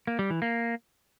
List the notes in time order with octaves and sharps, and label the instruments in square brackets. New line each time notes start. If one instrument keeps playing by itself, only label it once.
[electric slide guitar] A#3
G3
E3
A#3